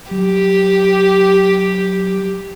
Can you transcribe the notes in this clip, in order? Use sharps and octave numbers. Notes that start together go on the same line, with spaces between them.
F#3 G4